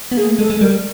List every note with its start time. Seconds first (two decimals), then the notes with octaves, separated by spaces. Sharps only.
0.12 B3
0.17 A#3 G#4
0.27 A3
0.39 G#3 A4
0.50 G#3
0.61 G3 A#4